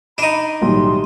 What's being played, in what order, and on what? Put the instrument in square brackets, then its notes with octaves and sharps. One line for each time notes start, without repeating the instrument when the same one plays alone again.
[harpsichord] D4 D#4 [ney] B5
[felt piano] B1 A2 [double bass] D#3 G3 [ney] C6